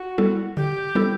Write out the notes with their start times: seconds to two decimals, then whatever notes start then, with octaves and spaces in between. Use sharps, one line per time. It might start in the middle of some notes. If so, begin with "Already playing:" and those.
Already playing: F#4
0.18 G3 B3 E4 A4
0.57 D3 G4
0.95 G3 B3 E4 A4